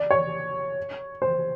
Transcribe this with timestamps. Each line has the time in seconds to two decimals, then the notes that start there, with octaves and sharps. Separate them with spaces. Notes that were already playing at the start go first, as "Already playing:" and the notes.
Already playing: D5
0.11 C#5
1.22 C5